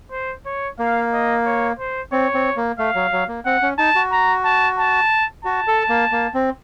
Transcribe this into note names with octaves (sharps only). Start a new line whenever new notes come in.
C5
C#5
A#3 F5
D#5
C#5
C5
C4 C#5
C4
A#3
A3 F5
F#3
F#3
A#3
C4 F#5
C#4
D#4 A5
F#4
A#5
A5
A5
F#4 A5
A4
A#3
A#3
C4